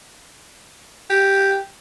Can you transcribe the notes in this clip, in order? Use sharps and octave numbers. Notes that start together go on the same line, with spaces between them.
G4